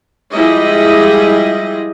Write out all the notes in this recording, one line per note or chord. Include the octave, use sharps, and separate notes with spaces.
F3 G3 G#3 E4 G#4 D#5